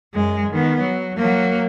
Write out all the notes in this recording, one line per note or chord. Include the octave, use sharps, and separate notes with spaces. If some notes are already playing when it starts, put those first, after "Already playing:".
F#2 G#3
D#3 B3
F#3
F#3 A#3